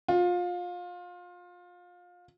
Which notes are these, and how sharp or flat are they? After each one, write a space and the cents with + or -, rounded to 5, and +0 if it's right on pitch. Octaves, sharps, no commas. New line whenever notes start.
F4 +25